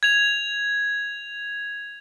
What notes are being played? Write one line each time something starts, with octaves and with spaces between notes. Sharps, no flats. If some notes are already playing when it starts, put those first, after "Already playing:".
G#6 F7